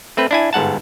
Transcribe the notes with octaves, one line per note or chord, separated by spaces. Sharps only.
A3 C4 B4
D4 E4 G#5
G1 G#2 F#5 A5